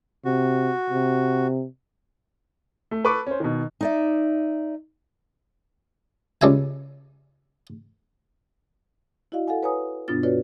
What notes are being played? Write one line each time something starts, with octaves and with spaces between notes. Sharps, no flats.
C3 F#4
C3
A3
A4 B4 A5 B5 C#6 D6
C#4 C5
B2 D#3
D#4 D5 E5
C#2 G3 E5 G#5
E4 F#4 D5 D#5 F5
A4 F5 F#5 G#5
B4 C#5 G#5 A#5 D#6
G2 B2 B3 D4 F4 A6
F4 F#4 B4 C#5 D5